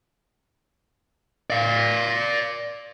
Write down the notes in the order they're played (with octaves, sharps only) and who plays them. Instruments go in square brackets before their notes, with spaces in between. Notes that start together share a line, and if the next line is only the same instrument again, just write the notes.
[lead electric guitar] D5 F5